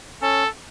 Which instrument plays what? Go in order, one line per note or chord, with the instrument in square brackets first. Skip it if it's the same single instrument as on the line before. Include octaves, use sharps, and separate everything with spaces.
[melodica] C#4 [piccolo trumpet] A4